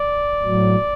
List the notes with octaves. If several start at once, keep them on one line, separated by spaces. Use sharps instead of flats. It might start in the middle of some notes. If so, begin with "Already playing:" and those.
Already playing: D5
A2 F#3